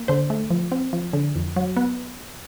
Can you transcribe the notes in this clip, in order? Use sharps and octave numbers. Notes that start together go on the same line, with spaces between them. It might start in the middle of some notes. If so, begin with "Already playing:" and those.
Already playing: A#3
D3 C5
A3
F3
C4
F3
D3
F2
F#3
B3